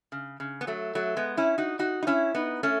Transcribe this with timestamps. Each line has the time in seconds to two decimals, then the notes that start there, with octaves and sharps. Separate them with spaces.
0.12 C#3
0.40 C#3
0.61 B3
0.67 F#3 A3
0.95 F#3 A3
1.17 G#3 B3
1.37 C#4 E4
1.58 D#4 F#4
1.79 D#4 F#4
2.03 D#4
2.07 C#4 E4
2.35 B3 D#4
2.63 A3 C#4